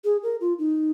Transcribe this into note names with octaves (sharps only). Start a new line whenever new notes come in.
G#4
A#4
F4
D#4